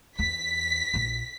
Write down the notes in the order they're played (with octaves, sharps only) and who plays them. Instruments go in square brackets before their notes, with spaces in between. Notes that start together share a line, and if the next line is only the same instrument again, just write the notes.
[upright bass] E2 [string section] B6
[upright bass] A#1 A#3